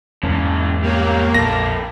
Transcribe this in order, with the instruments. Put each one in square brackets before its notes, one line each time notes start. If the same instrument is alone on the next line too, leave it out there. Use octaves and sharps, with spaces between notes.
[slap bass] E2 G#2 F#3 [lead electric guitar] C#3 A#3
[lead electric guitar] G3 C#5 [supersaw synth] A#3
[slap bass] A#1 F2 [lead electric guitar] A#2 A4 [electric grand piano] A#6